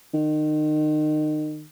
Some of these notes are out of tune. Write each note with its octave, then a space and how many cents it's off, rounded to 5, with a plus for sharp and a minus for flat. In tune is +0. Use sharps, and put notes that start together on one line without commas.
D#3 -30